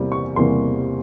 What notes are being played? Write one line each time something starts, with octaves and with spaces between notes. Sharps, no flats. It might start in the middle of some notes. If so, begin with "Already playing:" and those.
Already playing: E2 C3 G3 A#3
C#6
E2 C3 G3 A#3 C6